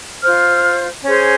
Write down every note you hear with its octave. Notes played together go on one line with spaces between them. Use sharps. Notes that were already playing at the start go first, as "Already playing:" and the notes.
F4 C5 F6
C#4 G#4 C5